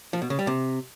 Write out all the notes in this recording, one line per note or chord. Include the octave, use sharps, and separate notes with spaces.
F3
B2
C#3
G3
C3